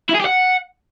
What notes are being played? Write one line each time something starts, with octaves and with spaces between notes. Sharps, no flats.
E4
G#4
G4
F#5